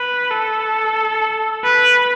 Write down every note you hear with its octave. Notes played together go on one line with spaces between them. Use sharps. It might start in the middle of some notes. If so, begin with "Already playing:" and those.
Already playing: B4
A4
B4